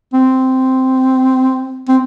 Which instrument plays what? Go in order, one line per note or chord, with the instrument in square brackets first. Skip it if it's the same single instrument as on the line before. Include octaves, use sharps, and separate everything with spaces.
[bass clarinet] C4
C4